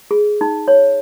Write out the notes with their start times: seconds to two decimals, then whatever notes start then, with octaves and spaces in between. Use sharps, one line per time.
0.11 G#4
0.41 D#4
0.68 C#5